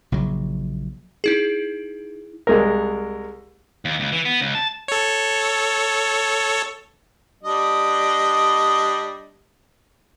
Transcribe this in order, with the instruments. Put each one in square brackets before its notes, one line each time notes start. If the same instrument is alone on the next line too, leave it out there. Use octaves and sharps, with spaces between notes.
[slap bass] A#1 C#3 F#3
[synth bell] D#4 E4 G#4
[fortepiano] C2 G#3 A#4
[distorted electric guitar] D#2
C#2
E3
B3
C#2
A5
[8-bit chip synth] A4 C#5
[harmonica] G3 D4 D#5